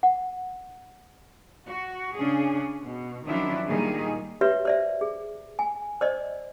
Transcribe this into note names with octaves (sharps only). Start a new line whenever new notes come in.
F#5
F#4
C#3 C#4 D4 G#4
B2
D#3 F3 F#3 C#4 D4 E4
A#2 D#3 G3 A#3 D#4 G#4
F#4 G4 B4 C#5 E5
C5 D5 E5
G#4
G#5
C5 D5 D#5